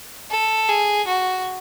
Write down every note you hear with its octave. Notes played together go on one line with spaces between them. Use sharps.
A4
G#4
F#4